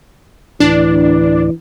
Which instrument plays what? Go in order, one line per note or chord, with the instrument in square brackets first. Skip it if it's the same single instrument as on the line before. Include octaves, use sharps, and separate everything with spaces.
[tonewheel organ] D2 A2 D5 [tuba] E3 [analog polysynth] D4